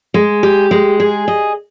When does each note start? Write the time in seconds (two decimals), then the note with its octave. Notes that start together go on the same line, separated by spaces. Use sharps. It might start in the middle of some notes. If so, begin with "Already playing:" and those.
0.14 G#3
0.43 G4
0.71 G#3
1.00 G#4
1.28 D#5